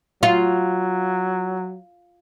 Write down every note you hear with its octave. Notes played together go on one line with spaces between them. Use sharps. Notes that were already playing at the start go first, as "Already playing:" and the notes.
F#3 F4